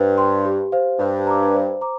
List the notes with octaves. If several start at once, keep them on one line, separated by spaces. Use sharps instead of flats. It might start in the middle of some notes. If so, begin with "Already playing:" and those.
Already playing: G2 C5
G5 C6
G4
C5 F5
G2 C5
A#5 D6
C5
A#5 D6